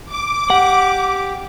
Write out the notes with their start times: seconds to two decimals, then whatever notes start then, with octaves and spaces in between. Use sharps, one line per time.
0.13 D6
0.50 G4 F#5